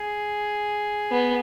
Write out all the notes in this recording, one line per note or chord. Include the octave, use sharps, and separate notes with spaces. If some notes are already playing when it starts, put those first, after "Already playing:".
Already playing: G#4
B3